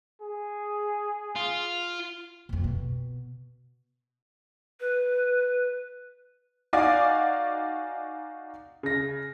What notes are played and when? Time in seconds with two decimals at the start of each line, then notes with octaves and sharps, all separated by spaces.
0.21 G#4
1.36 F4
2.49 F2 A#2
2.64 B2
4.80 B4
6.73 D#4 F#4 D5 F5 G#5 D6
8.83 C#3 A#6